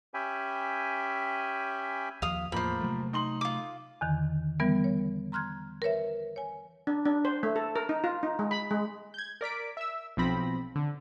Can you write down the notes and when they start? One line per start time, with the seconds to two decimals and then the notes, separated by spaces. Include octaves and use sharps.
0.14 C#4 G4 E5 G5 G#5 B5
2.22 D#2 F3 F5 D#6
2.52 E2 A2 F3 A#3 C5 B5
2.80 C3 F#3 A3
3.13 D#4 C6 F#7
3.41 F4 D6
4.01 E2 D3 D#3
4.60 D3 E3 G3 B3 A#4
4.84 C#5
5.32 A#5 C6 F6 F#6 G#6
5.82 A#4 B4 C#5 E5
6.36 C#5 G#5
6.87 D4
7.05 D4
7.25 C5
7.43 A3
7.56 A4
7.76 A#4
7.89 D#4
8.04 F4
8.23 D#4
8.39 G#3
8.51 B5
8.71 G#3
9.14 G6 G#6
9.41 A#4 D5 B6 D7
9.77 E5 E6
10.17 B1 F3 C4 B5 A#6
10.76 D3